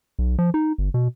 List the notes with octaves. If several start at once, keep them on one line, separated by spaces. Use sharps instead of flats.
B1
F3
D#4
G1
B2